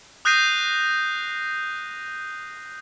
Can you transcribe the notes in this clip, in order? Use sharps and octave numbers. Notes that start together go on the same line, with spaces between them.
D#6 F#6 G6 A#6 C7 D#7